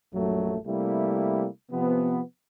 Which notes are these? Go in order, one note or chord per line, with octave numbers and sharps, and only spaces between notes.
A#1 F#2 F#3 A3
C3 G3 A3 A#3 E4
C3 F3 B3